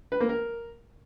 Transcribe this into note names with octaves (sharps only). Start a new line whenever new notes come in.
B4
A#3
A#4